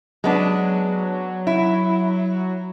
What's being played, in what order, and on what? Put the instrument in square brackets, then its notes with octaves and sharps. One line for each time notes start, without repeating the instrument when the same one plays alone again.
[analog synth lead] F#3 [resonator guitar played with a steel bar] G#3 B3 D4
[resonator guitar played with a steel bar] E4